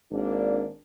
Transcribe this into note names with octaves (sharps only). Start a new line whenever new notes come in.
G#1 A#3 D4